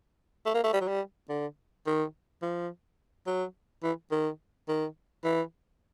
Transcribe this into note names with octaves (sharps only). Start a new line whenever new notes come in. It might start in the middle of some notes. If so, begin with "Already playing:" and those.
A3
A#3
A3
G3
F#3
G3
D3
D#3
F3
F#3
E3
D#3
D#3
E3